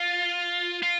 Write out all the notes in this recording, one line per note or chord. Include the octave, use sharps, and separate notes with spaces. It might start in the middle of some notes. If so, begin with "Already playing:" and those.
Already playing: F4
F4